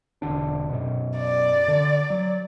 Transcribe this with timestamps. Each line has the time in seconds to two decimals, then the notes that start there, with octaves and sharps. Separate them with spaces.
0.22 E1 D3 D4
0.70 F#2 B2
1.17 D5
1.68 D3
2.10 F#3